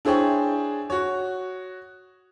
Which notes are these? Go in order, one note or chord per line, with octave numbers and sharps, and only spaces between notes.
D4 E4 G#4 C5 C#5 G5
F#4 C#5